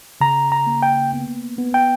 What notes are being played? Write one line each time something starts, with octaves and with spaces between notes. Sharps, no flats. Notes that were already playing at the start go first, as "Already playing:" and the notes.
C#3 A#5
A#5
A#3
G5
B3
B3
G5